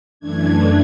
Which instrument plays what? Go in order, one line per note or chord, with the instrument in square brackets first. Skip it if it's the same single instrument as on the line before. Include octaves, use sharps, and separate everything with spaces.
[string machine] F#2 E3 A3 D4 G#6